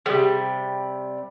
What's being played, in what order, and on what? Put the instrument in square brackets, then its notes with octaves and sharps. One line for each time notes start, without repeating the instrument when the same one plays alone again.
[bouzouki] C3 G3 [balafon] G4 G#4